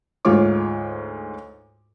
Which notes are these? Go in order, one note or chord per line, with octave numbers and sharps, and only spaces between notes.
D2 G#2 G#3 F4 C#5 D6